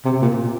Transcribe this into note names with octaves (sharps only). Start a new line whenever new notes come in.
C3
A#2